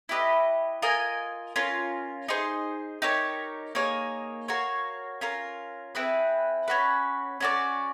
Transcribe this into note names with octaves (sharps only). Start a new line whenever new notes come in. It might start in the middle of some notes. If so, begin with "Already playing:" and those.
E4 G4 B4 D#5
F4 A#4 D#5 G#5
C#4 F4 A#4
D#4 G#4 C5
D#4 G4 A#4 C#5
A#3 D#4 G#4 C#5
F#4 A#4 C#5 F5
C#4 F4 A#4
C4 E4 G#4 B4
C#4 F#4 B4
C#4 F#4 A#4 D5